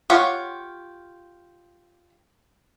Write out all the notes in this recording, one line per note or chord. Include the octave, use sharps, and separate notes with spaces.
F4 G4 C#5 F#5